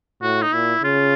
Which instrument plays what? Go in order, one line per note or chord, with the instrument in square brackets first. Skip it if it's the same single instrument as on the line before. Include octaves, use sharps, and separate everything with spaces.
[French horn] A2 [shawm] F#4
[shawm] D#4
[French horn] A#2 [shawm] E4
[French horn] C#3 [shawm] F4